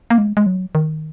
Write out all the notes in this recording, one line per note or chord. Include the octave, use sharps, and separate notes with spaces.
A#3
G#3
G#3
F#3
D#3